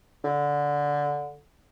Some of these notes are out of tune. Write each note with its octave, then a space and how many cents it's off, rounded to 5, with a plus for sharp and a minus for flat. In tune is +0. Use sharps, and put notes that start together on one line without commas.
D3 -10